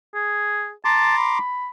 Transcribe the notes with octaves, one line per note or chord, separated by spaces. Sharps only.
G#4
A5 A#5 C6 D6
B5